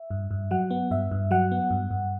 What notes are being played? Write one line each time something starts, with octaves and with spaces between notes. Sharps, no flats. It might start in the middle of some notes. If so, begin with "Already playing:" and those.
Already playing: E5
G2
G2
F#3 F#5
B3
G2 E5
G2
F#3 F#5
B3
G2
G2